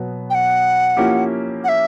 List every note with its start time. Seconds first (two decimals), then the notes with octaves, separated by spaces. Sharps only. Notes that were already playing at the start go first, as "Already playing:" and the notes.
Already playing: B2 F#3 B3
0.30 G5
0.35 F#5
0.97 F3 A#3 C#4 E4 G4
1.64 F#5
1.69 E5